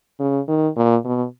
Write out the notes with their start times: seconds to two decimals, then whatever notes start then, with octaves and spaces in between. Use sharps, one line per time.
0.20 C#3
0.48 D#3
0.76 A#2
1.05 B2